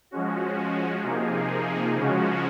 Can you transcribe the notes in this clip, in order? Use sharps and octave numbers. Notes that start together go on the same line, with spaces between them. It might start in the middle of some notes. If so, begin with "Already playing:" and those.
F3 G#3 C#4 F#4
C3 F3 A#3 D#4 G#4
C#3 F3 G#3 C#4 F#4